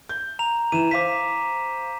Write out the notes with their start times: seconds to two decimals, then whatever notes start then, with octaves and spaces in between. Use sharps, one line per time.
0.09 G6
0.39 A#5 F7
0.72 E3 D#7 E7
0.91 C5 F5 A#5 D6 B6